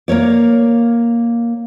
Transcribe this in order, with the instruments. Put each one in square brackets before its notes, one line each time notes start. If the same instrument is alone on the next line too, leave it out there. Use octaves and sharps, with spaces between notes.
[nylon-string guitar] A#3 A#4 C#5 D5